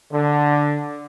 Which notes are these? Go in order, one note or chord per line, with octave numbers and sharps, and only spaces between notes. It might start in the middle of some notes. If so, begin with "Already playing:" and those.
D3